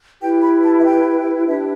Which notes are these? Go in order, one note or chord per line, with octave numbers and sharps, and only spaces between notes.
E4 G4 B4 G5
B5
A5
E5
G5
D4 G4 B4 E5